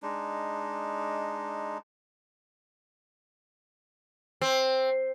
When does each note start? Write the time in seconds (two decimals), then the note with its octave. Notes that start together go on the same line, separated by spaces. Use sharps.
0.03 G#3 D4 D#4
4.42 C4